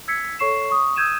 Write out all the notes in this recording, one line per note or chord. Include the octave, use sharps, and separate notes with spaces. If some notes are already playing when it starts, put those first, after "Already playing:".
E6 G#6 B6 C#7
A4 C#5 C#6 C7 E7
C#6 D#6
D#6 E6 G6 G#6 D#7 E7